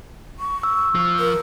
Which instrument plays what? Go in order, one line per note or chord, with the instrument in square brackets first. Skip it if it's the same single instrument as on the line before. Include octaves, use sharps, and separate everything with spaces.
[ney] C#6
[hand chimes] E6
[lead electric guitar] F3
[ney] A#4